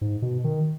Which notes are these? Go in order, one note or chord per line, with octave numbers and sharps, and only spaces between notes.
G#2
B2
D#3